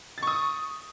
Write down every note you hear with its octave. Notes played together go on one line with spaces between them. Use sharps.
C#6 D#6 A6